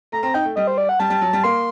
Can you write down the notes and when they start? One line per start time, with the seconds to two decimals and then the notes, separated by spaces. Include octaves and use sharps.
0.12 A3 A#5
0.23 C4 A#5
0.34 D#4 G5
0.45 A3
0.56 G3 D#5
0.67 C5
0.78 D5
0.89 F#5
1.00 G3 A5
1.10 G3
1.21 F#3
1.33 G3
1.44 A#3 C6